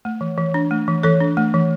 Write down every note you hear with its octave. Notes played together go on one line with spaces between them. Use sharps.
A3
E3
E3
D4
A3
E3
E3 A4 C#5
D4
A3
E3